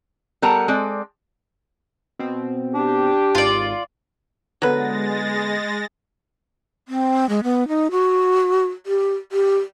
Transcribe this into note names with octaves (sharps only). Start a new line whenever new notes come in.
G3 B3 A4 A#4 F#5 A5
G#3 C4 A4 D5
B2 C4
D4 G4
G#1 F4 D5
D3 F#3 G#3 B3 B4 A6 A#6
C4
G#3
B3
D#4
F#4
G4
G4